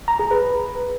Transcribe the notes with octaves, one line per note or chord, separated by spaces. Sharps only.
A#5
G#4
B4